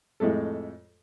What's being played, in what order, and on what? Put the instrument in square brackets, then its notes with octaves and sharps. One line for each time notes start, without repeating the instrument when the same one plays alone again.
[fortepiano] F2 A2 G#3 A3 A4